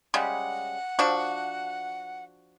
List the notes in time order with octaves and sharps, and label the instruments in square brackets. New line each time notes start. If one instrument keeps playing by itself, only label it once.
[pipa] C#3 G3 G#3 [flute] F#5
[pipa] F3 D4 F#4